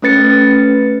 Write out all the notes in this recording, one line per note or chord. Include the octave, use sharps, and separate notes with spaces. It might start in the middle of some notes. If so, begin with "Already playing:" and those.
A3 C#4 B4 A6 C#7